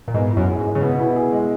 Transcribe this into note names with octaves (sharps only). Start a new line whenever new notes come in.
A#2
G#2 B3
E4
F#2
G#4
G#2
G#3
C#3
B2 B3
E4
G#4
G#3